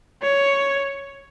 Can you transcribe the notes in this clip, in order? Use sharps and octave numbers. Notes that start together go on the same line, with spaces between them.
C#5